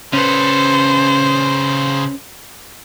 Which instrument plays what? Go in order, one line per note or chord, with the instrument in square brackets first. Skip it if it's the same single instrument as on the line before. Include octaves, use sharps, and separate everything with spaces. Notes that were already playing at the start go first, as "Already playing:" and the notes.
[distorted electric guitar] C#3 A4 [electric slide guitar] C#4 B4 [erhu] C5